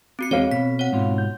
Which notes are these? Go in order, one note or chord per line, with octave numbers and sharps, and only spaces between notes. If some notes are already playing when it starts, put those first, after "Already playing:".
C4 F#4 C#7
E2 G#3 C4 F#4 A4 C#5 F5
B2 B6
C#5 F#5
G#2 B2 F4
G6